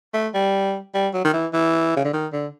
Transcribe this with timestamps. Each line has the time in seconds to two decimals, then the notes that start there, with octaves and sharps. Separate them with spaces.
0.14 A3
0.34 G3
0.94 G3
1.13 F#3
1.24 D#3
1.33 E3
1.53 E3
1.96 C#3
2.04 D3
2.13 D#3
2.33 D3